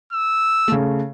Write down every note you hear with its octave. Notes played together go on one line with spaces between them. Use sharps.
E6
C#3 A3